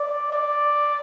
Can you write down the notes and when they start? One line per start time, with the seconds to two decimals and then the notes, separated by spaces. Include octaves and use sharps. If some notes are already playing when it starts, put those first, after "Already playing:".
Already playing: D5
0.33 D5